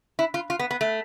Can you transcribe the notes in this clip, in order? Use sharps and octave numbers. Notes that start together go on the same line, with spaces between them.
E4
F4
F4
B3
B3
A3